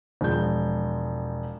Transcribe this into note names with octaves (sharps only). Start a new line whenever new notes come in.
E1 F3 G#3 G6